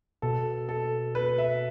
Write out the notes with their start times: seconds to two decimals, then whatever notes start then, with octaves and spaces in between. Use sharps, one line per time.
0.22 B2 A4
0.69 A4
1.15 B4
1.38 E5